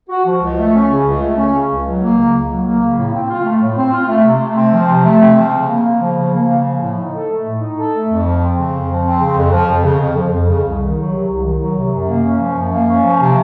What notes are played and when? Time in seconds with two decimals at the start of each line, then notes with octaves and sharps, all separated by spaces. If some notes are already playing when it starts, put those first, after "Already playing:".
0.09 F#4
0.25 F3
0.41 C#2
0.57 A3
0.73 C#4
0.89 C#3
1.05 C#2
1.21 A3
1.37 C#4
1.53 C#3
1.69 C#2
1.84 F#3
2.01 A#3
2.17 C#3
2.33 C#2
2.49 F#3
2.65 A#3
2.81 C#3
2.96 A2
3.13 C4
3.29 F4
3.45 A3
3.60 A2
3.77 C4
3.92 F4
4.08 A3
4.25 C3
4.41 A3
4.56 C4
4.73 F3
4.89 C3
5.05 A3
5.20 C4
5.37 F3
5.53 C#3
5.69 A#3
5.84 C#3
6.00 F3
6.16 C#3
6.33 A#3
6.48 C#3
6.65 F3
6.81 A2
6.97 D#4
7.12 A4
7.28 A3
7.44 A2
7.61 D#4
7.76 A4
7.92 A3
8.08 F2
8.24 F3
8.41 C4
8.56 C#3
8.72 F2
8.88 F3
9.04 C4
9.20 C#3
9.37 F2
9.53 F3
9.68 F2
9.84 C#3
10.00 F2
10.17 F3
10.32 F2
10.49 C#3
10.65 C2
10.80 D#3
10.96 F#3
11.12 C3
11.28 C2
11.44 D#3
11.60 F#3
11.76 C3
11.92 F#2
12.08 A#3
12.24 C#4
12.40 F3
12.56 F#2
12.73 A#3
12.88 C#4
13.04 F3
13.20 C3